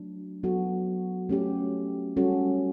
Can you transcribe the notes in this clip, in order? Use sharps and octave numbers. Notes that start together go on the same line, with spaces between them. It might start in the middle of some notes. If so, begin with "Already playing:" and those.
Already playing: F#3 A3 D4
F#3 B3 F#4 A4
A3 C#4 G4
G3 C#4 F#4 A4